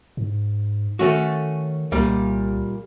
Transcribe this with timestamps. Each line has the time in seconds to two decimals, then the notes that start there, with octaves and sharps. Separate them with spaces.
0.17 G#2
0.99 D#3 A3 C#4 F#4
1.92 C2 A#2 G3